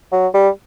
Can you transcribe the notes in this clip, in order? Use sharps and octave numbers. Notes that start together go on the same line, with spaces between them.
F#3
G3